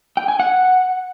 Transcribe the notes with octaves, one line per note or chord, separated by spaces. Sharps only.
G5
G#5
F#5